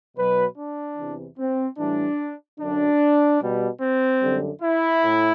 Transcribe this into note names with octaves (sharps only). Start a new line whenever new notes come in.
B2 F#3 B4
D4
E2 C3 E3
C4
A2 E3 G3 D4
F#2 D3 F#3 D4
B2 G3
C4
F#2 D3 G3
E4
A2